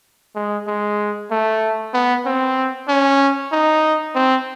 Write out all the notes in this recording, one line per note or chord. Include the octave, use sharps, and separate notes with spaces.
G#3
G#3
A3
B3
C4
C#4
D#4
C4